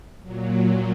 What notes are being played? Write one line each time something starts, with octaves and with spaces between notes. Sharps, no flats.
A#2 F#3